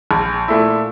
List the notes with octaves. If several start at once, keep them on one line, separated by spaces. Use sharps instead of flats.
A#1
A#2 A3 E4